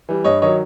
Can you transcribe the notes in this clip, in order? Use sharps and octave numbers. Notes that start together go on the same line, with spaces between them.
E3 G3
G2 C#5 D#5
D#3 F#3 C#5 D#5